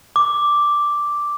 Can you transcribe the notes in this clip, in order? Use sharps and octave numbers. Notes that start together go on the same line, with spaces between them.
D6